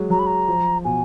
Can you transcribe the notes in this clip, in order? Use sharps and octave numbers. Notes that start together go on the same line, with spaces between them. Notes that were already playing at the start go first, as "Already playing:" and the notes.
Already playing: F#3 G#3
F#3 A#5
B5
A#5
F3
B2 G#5